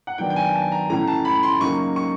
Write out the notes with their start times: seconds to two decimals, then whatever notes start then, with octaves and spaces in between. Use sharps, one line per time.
0.07 F#5
0.18 D#3 F#3 B3 D4 G5
0.30 G5
0.36 G#5
0.54 A5
0.72 A#5
0.89 A2 E3 A3 C#4 E4 A#5
1.08 A5
1.25 B5
1.43 C6
1.61 C#3 F#3 A#3 D#4 C#6
1.96 C#6